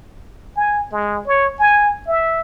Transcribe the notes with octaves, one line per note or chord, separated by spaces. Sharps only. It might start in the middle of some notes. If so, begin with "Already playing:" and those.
G#5
G#3
C#5
G#5
E5